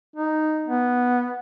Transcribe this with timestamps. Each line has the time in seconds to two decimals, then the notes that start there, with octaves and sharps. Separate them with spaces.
0.16 D#4
0.68 B3